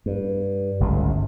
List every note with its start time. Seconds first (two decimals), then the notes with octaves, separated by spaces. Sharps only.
0.06 G2
0.80 G1 C#2 A2